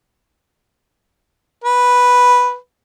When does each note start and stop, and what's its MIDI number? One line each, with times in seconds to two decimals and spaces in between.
1.64 2.56 71